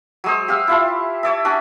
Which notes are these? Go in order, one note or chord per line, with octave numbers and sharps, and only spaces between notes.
F#3 G#3 C5
G4 F5 E6
E4 F4 A5
C#5 D5 E5
C#4 D4 F#4